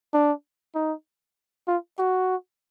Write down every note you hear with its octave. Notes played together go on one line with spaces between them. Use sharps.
D4
D#4
F4
F#4